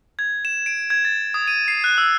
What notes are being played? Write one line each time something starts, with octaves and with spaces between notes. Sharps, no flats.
G#6
E7
D7
G#6
A6
D#6
D#7
C7
F#6
E6